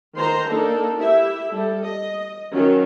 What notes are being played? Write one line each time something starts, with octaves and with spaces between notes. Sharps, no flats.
D#3 C5 A#5 C6
A#3 D4 D#4 A4
E4 G4 E5
G3 A4
D#5
D#3 F#3 C#4